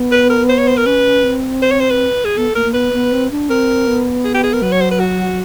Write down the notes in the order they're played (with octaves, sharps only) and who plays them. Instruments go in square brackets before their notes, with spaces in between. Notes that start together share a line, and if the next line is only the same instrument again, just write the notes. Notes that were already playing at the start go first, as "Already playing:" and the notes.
Already playing: [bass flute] B3
[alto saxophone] B4
A#4
C5
C#5
C5
A#4
[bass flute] C#4 [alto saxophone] B4
[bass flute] C4
[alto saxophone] C5
C#5
C5
B4
G#4
[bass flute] B3 [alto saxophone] A4
[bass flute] A#3 [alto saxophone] A#4
[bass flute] A#3
[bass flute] B3 [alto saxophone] B4
[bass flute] B3
C4
D4
[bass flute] C4 [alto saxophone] A#4
[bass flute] B3
[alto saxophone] G#4
G4
G#4
A#4
[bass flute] F#3 [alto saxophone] B4
[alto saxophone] C#5
C5
B4
F#4